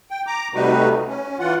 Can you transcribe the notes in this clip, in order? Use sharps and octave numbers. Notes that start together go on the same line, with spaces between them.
G5
A#5 D6
C3 G3 A3 D#4 F#4 B4
C#4
E3 F4 F#5